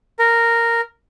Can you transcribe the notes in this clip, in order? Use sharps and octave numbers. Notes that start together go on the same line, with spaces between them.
A#4